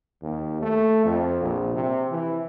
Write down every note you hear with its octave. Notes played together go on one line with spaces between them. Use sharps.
D#2
A3
F2
A#1
C3
E3